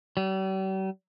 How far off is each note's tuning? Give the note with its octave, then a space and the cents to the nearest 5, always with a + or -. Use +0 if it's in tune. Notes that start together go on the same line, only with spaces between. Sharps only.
G3 -45